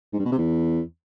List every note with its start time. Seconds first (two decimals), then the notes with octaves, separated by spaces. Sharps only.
0.13 G#2
0.19 G2
0.25 B2
0.32 C3
0.38 E2